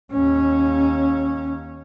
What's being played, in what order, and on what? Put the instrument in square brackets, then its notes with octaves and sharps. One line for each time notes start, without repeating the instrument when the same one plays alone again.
[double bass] D#2 C#4